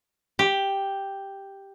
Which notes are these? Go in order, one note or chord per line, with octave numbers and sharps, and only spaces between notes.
G4